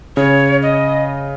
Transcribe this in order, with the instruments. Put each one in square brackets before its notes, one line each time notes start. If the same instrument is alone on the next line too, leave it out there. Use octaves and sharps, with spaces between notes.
[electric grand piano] C#3 [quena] C#5
[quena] D#5